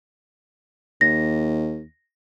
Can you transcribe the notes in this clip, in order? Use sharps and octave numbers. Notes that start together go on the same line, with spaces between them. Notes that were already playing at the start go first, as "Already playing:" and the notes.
D#2 A#6